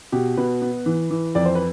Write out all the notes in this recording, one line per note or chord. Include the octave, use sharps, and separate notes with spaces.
B2 G4
B2 B4
B3
E3
E3
F2 D5
C5
B4